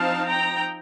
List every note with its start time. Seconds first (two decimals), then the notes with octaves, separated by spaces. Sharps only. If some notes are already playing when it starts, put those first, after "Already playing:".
Already playing: F3 C4 D#4 F5 A5
0.28 G5 A#5